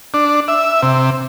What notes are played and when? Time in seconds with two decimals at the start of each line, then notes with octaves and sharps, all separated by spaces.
0.14 D4
0.48 E5
0.83 C3